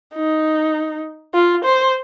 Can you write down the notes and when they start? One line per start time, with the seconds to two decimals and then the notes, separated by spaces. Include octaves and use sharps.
0.15 D#4
1.34 F4
1.64 C5